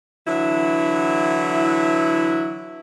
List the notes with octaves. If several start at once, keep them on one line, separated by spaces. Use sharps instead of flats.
D3 E3 F#3 E4